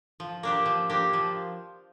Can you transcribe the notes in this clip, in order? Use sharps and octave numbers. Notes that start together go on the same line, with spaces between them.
F3
A#3 D4 G4
F3
A#3 D4 G4
F3